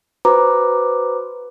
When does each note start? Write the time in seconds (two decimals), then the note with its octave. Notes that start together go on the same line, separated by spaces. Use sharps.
0.25 F#4 B4 C5 A#5 D6